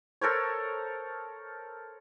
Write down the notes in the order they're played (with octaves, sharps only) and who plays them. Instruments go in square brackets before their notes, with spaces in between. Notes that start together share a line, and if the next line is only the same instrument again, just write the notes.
[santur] A4 A#4 C5 C#5